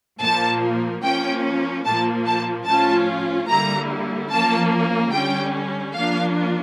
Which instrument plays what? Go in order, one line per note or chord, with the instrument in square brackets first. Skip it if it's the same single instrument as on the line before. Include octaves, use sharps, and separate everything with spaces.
[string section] A#2 F3 A#3 A5
F3 A#3 C#4 G5
A#2 F3 A#3 A5
A5
A2 F3 C#4 F4 A5
D3 G3 A#3 E4 A#5
F3 A#3 C#4 F4 A5
D3 G3 C#4 G5
F3 A#3 D4 F4 F5